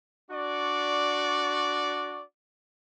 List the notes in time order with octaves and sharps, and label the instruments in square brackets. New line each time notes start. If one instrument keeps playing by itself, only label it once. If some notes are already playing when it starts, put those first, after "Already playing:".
[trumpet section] D4 F#4 D5 C#6